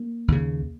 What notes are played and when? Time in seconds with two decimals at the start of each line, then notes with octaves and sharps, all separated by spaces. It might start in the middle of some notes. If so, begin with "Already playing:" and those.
Already playing: A#3
0.28 D#2 C#3